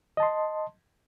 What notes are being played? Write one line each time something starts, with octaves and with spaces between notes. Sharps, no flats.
D#5 A5 C6